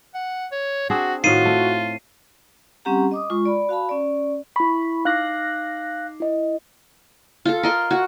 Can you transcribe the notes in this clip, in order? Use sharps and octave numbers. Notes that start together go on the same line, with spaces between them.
F#5
C#5
C4 D4 F#4 G#4
A2 D#3 F4 F#4 C7 D#7
A3
G3 C4 C#4 G4 F#5 A#5
D#5 D6 D#6
G#3 F4 C#6
D5 B5
F#4 F5 A5 B5
C#4 D5
E4 B5 C#6
D#4 F5 D6 F#6 A#6 C7
E4 D#5
F4 A4
A#4 D#5 C6
F#4